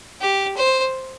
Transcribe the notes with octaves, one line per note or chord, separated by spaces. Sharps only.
G4
C5